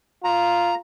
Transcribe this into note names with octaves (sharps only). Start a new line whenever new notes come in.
F4 A#5